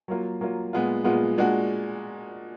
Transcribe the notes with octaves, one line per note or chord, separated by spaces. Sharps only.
F#3 A#3 F4
F#3 A#3 F4
A#2 G#3 B3 F4
A#2 G#3 B3 F4
A#2 G#3 D4 F#4